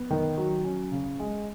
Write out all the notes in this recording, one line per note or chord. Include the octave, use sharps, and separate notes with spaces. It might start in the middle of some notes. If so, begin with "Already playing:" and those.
Already playing: B3
D#3
F#3
C#4
C#3
G#3